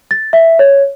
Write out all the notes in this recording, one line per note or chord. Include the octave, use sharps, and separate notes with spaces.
A6
E5
C#5